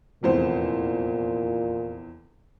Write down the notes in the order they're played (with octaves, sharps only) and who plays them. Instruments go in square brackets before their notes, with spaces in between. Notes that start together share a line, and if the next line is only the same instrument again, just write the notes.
[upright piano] F1 E2 C5 [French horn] A#2